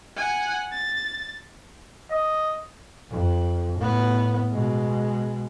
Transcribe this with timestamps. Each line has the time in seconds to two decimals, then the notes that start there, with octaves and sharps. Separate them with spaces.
0.16 F#5 G#5
0.72 A6
2.11 D#5
3.11 F2
3.79 A2 B3
4.51 B2 G#3